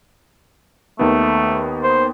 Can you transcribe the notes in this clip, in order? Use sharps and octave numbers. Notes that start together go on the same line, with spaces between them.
D#2 D#3 A3 B3
C5